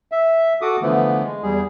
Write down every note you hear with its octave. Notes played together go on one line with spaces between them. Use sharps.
E5
F#4 A4 D6 D#6
D3 E3 F3 A3 B3
G#3
E2 G3 G#4